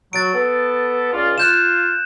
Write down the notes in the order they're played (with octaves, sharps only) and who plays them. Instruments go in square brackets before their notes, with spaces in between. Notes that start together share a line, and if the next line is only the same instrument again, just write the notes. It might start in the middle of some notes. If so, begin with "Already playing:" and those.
[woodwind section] F#3 [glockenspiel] A6 D7
[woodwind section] B3 A4
C#2 F4 D5
[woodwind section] F4 [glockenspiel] F#6 G6 E7